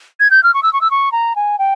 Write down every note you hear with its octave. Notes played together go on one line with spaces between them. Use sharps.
G#6
G6
F6
C#6
E6
C#6
E6
C#6
A#5
G#5
G5